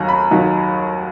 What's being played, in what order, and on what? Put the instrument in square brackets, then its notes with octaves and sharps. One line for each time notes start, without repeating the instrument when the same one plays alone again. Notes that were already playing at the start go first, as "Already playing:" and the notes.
Already playing: [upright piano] D#2 D#3 F#3 A#5
B5
D#2 D#3 F#3